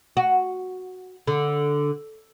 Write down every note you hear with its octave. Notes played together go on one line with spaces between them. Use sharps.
F#4
D3